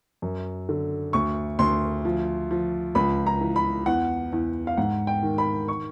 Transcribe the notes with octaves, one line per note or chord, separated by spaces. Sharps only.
F#2
D3
D2 C#6
D2 C6
F3
F3
C#2 B5
A#5
E3
B5
E2 F#5
E2
F5
G#2 F#5
G5
D#3
B5
C#6